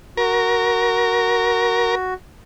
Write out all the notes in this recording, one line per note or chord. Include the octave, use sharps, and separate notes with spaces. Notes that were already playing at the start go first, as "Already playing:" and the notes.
F#4 A#4